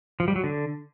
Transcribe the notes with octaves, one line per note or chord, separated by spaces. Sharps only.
F3
G3
F#3
D3